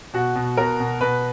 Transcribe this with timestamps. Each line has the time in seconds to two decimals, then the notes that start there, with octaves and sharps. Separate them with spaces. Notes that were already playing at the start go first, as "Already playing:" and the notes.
0.14 B2 F#4
0.35 B2
0.57 B2 A#4
0.80 B2
1.01 B2 B4